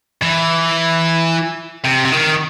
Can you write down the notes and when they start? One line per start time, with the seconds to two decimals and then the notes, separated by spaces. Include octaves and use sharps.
0.22 E3
1.85 C3
2.05 C3
2.12 D#3